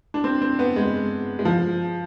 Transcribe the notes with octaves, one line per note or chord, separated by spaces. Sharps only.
D4
C4
C4
B3
G#3
G#3
F3